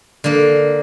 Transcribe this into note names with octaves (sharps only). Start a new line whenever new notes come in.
D3 A#3